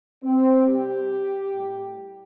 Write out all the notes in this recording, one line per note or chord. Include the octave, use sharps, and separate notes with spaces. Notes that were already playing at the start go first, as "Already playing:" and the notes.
C4
C3 G3 G4
A2 G3